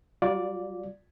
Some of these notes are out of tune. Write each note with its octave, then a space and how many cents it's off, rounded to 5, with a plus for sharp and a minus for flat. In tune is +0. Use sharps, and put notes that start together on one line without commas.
G3 -40 F4 +30 D5 -5